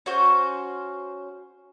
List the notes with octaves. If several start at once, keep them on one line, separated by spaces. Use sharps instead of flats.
C#4 F#4 C5